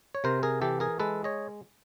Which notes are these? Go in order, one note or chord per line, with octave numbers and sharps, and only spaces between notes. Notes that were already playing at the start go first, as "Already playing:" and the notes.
C#5
C3 A#4 C5
G#4 A#4
E3 G4 A4
G#4 A#4
G#3 A4 B4
C#5 D#5